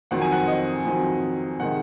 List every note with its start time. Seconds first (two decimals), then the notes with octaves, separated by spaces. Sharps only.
0.11 F2 D#3 F#3 C4 F#5
0.22 G#5
0.32 F#5
0.48 D#5
0.85 F2 D#3 F#3 C4
1.60 C3 D#3 G#3 F#5